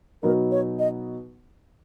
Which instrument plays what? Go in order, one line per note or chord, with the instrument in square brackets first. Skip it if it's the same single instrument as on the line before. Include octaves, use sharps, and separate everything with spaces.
[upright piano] B2 F#3 B3 D#4 [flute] A#4
[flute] C#5
D#5